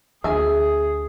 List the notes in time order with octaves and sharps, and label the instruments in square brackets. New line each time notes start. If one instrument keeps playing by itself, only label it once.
[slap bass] D2 [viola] G#4 [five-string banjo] E5 G#5